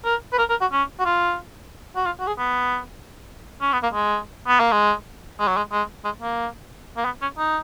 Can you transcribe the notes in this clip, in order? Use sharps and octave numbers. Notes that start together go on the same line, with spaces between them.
A#4
B4
A#4
A#4
F#4
C#4
F#4
F4
F#4
F4
F#4
G#4
B3
C#4
B3
A#3
G#3
B3
A#3
G#3
G#3
F#3
G#3
G#3
G#3
A#3
A#3
B3
C#4
D#4